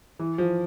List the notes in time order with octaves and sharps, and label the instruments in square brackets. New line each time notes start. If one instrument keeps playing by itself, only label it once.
[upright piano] E3
F3